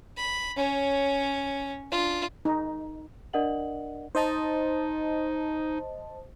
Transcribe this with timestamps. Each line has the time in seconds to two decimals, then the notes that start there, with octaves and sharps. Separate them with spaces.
0.17 B5
0.57 C#4 C#5
1.91 D4 F4
2.45 D#4
3.33 D4 A#4 D5 D#5 F#5 F#7
4.15 D#4 C5 D#5 A5